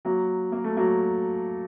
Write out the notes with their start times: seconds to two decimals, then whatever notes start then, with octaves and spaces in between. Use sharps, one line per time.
0.05 F#3 A#3
0.52 A#3
0.64 A3
0.77 F#3 A#3